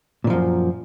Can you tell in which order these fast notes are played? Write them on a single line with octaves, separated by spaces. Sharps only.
A#2 D#3 F3 F#2